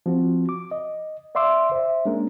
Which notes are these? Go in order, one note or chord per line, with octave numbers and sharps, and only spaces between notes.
F3 C4 F#4
D6
D#5
D5 E5 F5 C6 D6 E6
C5 E5
G#3 A#3 C#4 D4 A#4